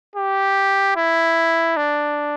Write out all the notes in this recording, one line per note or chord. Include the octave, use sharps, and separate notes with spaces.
G4
E4
D4